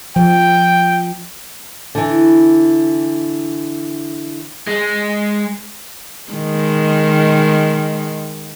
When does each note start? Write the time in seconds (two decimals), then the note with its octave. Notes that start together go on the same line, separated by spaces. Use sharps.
0.16 F3 G5
1.95 D3 E3
4.67 G#3
6.32 D#3 G#3